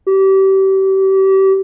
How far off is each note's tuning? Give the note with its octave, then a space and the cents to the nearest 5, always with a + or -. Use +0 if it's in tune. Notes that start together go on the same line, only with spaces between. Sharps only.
G4 -30